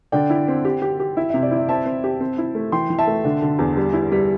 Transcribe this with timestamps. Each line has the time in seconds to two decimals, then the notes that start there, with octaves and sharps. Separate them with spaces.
0.12 D3 D5 G5
0.30 E4
0.48 C4
0.65 G4
0.82 G4
1.00 G4
1.17 E4 E5
1.30 C3 E5
1.43 D5
1.51 E4
1.56 E5
1.69 C4 E5 A5
1.86 C4
2.04 G4
2.20 C4
2.38 E4
2.55 A3
2.72 E3 G5 C6
2.90 E3
2.99 E5 A5
3.07 A3
3.24 D3
3.42 D3
3.59 E2
3.77 G3
3.93 E4
4.12 G3